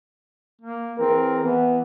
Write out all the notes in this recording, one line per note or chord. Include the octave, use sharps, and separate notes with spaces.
A#3
E3 C4 G#4 A#4
E3 B3